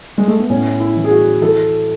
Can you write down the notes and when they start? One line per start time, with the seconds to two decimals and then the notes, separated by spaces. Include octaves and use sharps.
0.18 G#3
0.28 A3
0.40 B3
0.49 A2 C#4
0.80 E4
0.97 E3
1.04 G#4
1.11 F#4
1.42 E3 A4